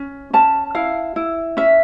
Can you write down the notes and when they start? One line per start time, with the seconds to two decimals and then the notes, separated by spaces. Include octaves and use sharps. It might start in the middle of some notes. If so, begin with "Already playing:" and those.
Already playing: C#4
0.33 C#4 A5
0.75 E4 F5
1.16 E4
1.57 C#4 E5